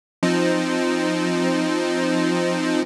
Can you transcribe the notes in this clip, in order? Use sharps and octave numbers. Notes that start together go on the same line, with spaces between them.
F3 C4 D#4